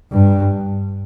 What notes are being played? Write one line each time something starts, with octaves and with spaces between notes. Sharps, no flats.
G2